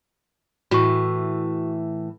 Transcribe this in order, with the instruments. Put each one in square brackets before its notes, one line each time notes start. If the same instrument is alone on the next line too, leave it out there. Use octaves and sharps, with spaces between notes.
[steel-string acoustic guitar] A2 E3 [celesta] F#4 C#6